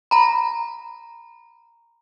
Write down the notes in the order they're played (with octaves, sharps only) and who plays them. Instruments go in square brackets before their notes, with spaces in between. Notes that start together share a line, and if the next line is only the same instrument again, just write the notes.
[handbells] A#5 B5